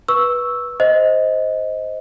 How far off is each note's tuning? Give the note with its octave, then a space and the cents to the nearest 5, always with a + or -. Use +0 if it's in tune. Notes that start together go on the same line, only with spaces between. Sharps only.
B4 -15 C#6 +5 E6 +0
C5 +0 D#5 +15